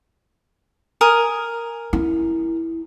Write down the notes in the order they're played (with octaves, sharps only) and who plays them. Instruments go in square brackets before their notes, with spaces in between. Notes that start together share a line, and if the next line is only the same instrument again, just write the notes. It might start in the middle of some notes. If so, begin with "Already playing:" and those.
[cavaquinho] A#4 G#5 D#6
[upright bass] E4